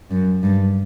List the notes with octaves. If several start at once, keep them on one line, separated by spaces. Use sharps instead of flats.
F#2
G2